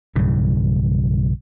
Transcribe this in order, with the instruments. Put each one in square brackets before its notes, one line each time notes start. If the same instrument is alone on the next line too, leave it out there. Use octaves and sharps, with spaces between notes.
[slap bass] B1 G2 C#3 E3